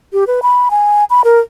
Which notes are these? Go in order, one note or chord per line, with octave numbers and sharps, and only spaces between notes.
G4
B4
B5
G#5
B5
A#4